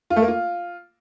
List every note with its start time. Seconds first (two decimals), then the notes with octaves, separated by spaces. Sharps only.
0.10 F4
0.16 A3
0.22 A#3
0.28 F4